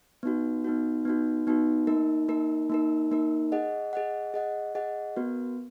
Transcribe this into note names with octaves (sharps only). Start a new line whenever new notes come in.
B3 D#4 F#4
B3 D#4 F#4
B3 D#4 F#4
B3 D#4 F#4
A#3 D#4 A#4
A#3 D#4 A#4
A#3 D#4 A#4
A#3 D#4 A#4
G#4 D#5 F#5
G#4 D#5 F#5
G#4 D#5 F#5
G#4 D#5 F#5
B3 F#4 A#4